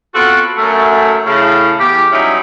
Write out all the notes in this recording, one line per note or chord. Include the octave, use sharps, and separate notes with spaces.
B3 C4 F4 F#4 A4
F#2 A3
A2 C#3
E2 G4
F#3 G3 C#4 D#4 E4